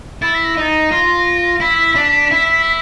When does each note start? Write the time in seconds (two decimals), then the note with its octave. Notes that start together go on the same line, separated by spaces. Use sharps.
0.22 E4 A6
0.35 B6
0.45 A#6
0.57 D#4 A6
0.68 A#6
0.92 F4
1.61 E4 B6
1.96 D4
2.31 E4